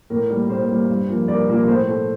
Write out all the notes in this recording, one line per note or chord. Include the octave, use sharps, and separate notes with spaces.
A2 A#4
G3 A#3
A2 C5
G3 A#3
G2
F3 A#3
G2 A#4 D5
F3 A#3
A2 C5
A3